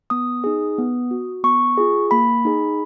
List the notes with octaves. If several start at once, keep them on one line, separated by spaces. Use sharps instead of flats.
B3 D#6
D#4 G#4
B3
F#4
B3 C#6
F4 G#4
A#3 B5
D#4 G#4